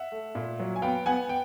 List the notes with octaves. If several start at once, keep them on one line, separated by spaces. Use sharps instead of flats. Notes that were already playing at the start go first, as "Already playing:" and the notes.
Already playing: E5 F#5
A3
A#2
F#3
G#5
B3 F5 G5
B3 F#5 G#5
G5